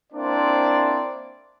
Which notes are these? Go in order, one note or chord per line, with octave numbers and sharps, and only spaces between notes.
A#3 C4 D4 E4 C5 D5